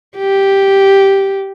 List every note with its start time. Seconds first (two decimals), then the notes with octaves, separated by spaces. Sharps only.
0.17 G4